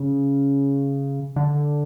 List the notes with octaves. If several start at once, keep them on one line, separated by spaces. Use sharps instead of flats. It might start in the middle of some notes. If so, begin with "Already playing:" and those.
Already playing: C#3
D3